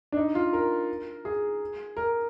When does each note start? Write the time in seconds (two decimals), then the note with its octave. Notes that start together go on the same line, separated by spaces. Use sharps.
0.12 D4
0.17 D#4
0.35 F4
0.53 A#4
1.25 G#4
1.97 A#4